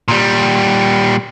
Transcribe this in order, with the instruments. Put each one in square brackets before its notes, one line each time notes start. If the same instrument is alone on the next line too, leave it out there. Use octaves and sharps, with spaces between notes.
[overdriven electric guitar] A#2 G3